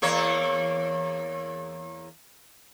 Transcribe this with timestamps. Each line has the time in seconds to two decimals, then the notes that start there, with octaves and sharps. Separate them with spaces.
0.02 E2 A#3 C#5